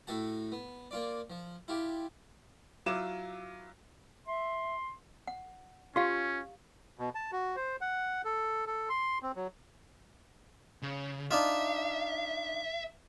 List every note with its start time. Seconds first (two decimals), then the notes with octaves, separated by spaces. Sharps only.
0.07 A2 A3 F#4 A5
0.52 B3
0.91 A#3 F4 D5
1.30 F3
1.68 E4 F4 G4
2.86 F#3 E4 F4 D6 E7
4.27 E5 C6
5.27 F#5
5.96 C#4 F4 G4 F5 C6
6.99 B2
7.15 A5
7.32 F#4
7.56 C5
7.81 F#5
8.25 A4
8.67 A4
8.89 C6
9.22 C4
9.36 F#3
10.82 C#3
11.31 D4 D#4 F4 E5